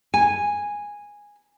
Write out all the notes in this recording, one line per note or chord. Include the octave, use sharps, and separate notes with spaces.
G#5